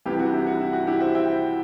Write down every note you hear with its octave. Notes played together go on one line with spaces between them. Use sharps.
C2 C3 E3 E4 G4
F#4
E4 G4
F#4
E4
F#4
E4 G4
C5 E5
E5 G5